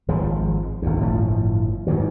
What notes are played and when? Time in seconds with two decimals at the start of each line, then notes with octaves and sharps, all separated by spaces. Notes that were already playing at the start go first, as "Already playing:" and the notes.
0.08 G#1 F3 G#3
0.82 G#1 D2
1.00 G1 A2 F3
1.87 G#2 D#3 E3 F#3